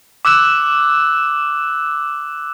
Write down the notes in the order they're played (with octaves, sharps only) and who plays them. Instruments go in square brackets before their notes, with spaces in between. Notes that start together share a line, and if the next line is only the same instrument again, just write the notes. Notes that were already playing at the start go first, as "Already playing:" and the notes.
[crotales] D6 E6 F#6 E7